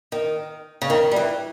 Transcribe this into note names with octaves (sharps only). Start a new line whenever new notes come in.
D#3
C#3
D#3
G3
E3